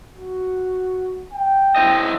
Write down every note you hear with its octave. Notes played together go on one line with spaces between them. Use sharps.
F#4
G5
E4 C5 D#5